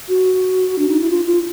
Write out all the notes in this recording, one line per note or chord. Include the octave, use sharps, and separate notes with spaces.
F#4
D4
D#4
E4
F4
F4